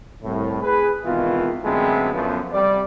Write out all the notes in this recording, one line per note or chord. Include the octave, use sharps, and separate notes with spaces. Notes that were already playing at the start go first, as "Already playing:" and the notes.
C2 A2
G#4 B4
G#1 B2 D#3 E3 F4
F#2 D3 G#3 A3 B3 C4
F#2 F3 A3 B3
C3 G3 D5